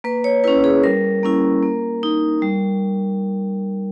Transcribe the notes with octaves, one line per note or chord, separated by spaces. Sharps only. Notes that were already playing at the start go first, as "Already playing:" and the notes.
A#3 B4
C#5
C#4 E4 B4
G#4
G3 A#4
A#3 C#4 E4
A#3
D#4
G3